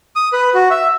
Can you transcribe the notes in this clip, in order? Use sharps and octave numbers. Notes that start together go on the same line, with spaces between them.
D#6
B4
F#4
E5